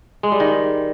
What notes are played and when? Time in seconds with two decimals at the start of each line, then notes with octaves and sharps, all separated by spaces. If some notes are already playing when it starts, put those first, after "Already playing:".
0.23 G#3
0.32 G3
0.40 D#3